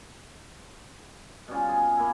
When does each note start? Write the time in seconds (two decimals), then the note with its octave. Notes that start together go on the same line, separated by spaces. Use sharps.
1.48 B2 G3 C#4 F4
1.69 G#4
1.97 A#3 E4